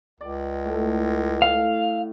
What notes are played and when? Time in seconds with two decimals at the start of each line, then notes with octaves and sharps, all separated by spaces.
0.21 C#2 D5
0.65 A2 A3
1.42 A2 F5